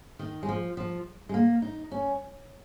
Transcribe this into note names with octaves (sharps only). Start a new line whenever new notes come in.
D#3
G#3
F3
F3
G#3
A#3
D#4
C#4